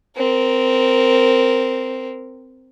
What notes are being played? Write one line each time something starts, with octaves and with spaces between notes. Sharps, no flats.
C4 A#4